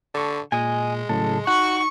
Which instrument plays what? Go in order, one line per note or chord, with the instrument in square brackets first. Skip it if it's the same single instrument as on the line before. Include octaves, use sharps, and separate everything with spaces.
[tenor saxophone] D3 [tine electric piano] A5 C#6
[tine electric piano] A#2 [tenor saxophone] G#3 [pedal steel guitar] D#5 G#5
[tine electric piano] A2 C#3 F#3 [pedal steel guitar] A4
[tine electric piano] D#4 [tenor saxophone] F#4 [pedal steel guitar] F#5 [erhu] C#6